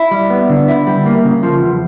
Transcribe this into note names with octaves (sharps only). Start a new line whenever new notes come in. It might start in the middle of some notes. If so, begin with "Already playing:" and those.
Already playing: E4
G3
B3
D3
E4
G3
A#3
C#3
F3
E2